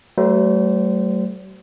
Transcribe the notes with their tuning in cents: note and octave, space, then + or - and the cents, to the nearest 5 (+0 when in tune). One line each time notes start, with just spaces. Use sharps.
F#3 +45 A3 +0 C5 -25